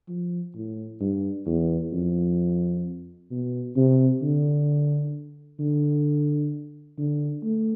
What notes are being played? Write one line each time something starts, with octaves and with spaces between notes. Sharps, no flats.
F3
A2
G2
E2
F2
B2
C3
D3
D3
D3
A3